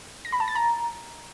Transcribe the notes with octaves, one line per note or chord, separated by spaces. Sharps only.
A#6
B5
A5
A6
A#5